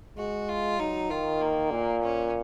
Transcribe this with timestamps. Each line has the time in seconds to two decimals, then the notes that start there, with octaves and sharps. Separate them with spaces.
0.18 G#3 F#4
0.49 F4
0.79 F#3 D#4
1.10 D#3 F4
1.41 A#3
1.72 A#2
2.02 C#4